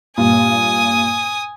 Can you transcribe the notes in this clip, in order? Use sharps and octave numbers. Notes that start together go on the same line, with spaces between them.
G2 A#2 G#5 D#6